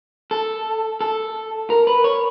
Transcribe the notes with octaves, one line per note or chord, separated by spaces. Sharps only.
A4
A4
A#4
B4
C#5